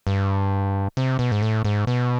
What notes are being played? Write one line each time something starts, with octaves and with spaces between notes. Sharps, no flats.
G2
C3
B2
G#2
A2
G#2
B2